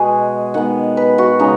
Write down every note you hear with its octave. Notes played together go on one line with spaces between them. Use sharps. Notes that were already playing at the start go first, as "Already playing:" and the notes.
Already playing: B2 G#3 B3 F#4 G#4
D#3 G#3 B3 F#5
B4
F#4
C#3 G#3 B3 D#4